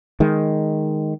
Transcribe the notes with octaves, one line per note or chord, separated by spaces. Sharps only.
D#3 G#3